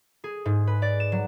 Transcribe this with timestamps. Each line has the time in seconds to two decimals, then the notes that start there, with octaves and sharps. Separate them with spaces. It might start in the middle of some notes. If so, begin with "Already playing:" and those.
0.24 G#4
0.45 G#2
0.67 B4
0.82 D5
1.00 E7
1.12 F#3